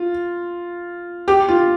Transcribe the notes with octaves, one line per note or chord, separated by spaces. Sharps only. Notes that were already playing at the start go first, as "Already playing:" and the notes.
Already playing: F4
G4
F4